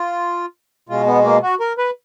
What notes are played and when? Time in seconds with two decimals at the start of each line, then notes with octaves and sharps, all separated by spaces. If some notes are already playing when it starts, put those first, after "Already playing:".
Already playing: F4
0.89 B2 G#3 F4
1.07 B3
1.24 A#3
1.42 F#4
1.60 A#4
1.78 B4